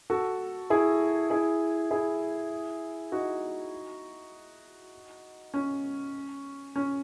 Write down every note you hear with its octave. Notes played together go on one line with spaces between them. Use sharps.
F#4 A4
E4 G#4
E4 G#4
E4 G#4
D#4 F#4
C#4
C#4